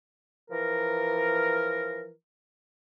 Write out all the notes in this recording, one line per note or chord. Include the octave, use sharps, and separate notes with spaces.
E3 F3 A#4